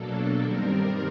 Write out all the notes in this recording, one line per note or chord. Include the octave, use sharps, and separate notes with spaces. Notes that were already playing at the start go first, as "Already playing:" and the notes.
Already playing: B2 F#3 A#3 D4 A4
G2 D#3 G3 C4 A#4